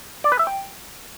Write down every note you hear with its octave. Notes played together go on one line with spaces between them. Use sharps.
D5
B4
E5
G5